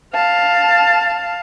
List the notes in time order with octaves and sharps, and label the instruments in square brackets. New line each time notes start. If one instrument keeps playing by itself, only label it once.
[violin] F5 A5